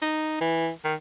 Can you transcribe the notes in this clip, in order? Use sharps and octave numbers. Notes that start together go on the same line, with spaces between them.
D#4
E3
D#3